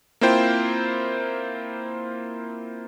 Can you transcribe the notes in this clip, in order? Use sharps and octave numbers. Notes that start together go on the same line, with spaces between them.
A#3 C4 E4 F4 C5 G5